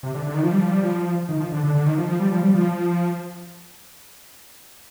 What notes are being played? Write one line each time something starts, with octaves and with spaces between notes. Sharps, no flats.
C3
D3
D3
D#3
F3
G3
F3
G3
F3
D#3
F3
D3
D3
D3
D#3
F3
F3
G3
F3
G3
F3